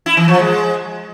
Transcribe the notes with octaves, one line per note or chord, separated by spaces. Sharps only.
E4
E3
F3
G#3